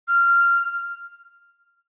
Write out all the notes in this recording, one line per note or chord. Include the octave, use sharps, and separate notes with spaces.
F6